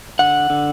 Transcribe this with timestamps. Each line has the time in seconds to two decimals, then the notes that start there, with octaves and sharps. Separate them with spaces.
0.19 D3 F#5
0.50 D3